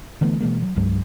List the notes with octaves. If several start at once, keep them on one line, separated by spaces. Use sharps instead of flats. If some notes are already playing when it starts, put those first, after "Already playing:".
D3 E3 A3 B3
B2 E3 G#3 A#3
F#3
C2 G2 F#3 G#3